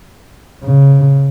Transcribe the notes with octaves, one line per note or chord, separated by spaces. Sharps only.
C#3